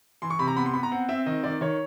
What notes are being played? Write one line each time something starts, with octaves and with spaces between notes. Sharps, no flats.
E3 C6
C#6
C3 B5
A#5
B3 B5
C6
B3 B5
A#5
C4 F#5
C4 E5
D#3 D#5
D#3 D5
D#3 C#5